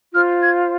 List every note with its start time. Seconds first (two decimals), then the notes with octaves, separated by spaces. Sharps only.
0.13 F4 C5 F6
0.42 G#6